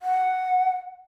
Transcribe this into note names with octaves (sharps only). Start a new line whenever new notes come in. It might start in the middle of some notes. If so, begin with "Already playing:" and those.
F#5